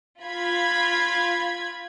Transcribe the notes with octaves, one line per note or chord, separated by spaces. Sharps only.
F4 B5 G#6